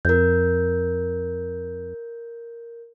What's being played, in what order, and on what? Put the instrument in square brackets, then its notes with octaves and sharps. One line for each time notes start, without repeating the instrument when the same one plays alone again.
[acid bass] F2 [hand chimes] A#4 G6